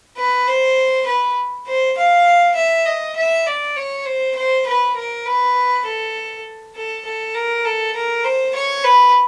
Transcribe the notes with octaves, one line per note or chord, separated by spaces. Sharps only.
B4
C5
B4
C5
F5
E5
D#5
E5
D5
C#5
C5
C5
B4
A#4
B4
A4
A4
A4
A#4
A4
A#4
C5
C#5
B4